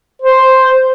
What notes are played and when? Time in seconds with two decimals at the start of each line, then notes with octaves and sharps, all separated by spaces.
0.22 C5